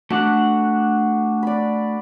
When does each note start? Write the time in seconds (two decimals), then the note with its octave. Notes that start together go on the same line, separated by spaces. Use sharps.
0.10 A3 D4 F#4 F#5
1.43 D5 B5